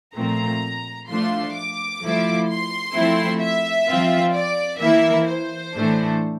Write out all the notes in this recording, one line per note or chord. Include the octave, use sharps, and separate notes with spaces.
A#2 F3 A3 C4 A#5
F3 A3 D4 F4 C6
D6
F3 A3 E4
C6
F3 A3 C4 E4
E5
F3 C4 F4
D5
E3 A#3 E4 E5
C5
A2 E3 A3 D4